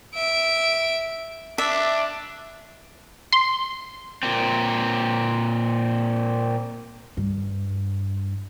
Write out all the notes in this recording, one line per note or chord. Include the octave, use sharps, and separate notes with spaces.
E5 D7
D4 E5
C6
A#2 C4
G2